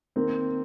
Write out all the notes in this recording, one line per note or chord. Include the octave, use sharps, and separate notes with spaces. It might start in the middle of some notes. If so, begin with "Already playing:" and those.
D#3 A#3 C4